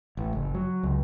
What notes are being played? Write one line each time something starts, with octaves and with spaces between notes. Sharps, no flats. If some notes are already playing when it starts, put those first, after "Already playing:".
A1
F#1
F#3
C#2